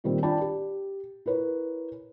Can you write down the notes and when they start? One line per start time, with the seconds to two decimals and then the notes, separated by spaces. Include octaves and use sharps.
0.04 A#2 D#3 G3 C4
0.23 D4 F4 D5 G5 A5 B5
0.42 G4
1.26 E4 A#4 B4 C#5